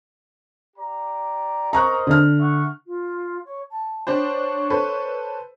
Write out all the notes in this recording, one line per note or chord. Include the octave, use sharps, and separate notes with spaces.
G4 D5 A#5
A#4 C5 D#5 A#5 C#6 F#6
D3 F6
E5 F#5 C#6
F4
C#5
A5
D4 G4 C5 C#5
A4 B4 C5